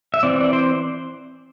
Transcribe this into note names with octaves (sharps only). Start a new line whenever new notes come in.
E5
E3 C4 D5
D5
C5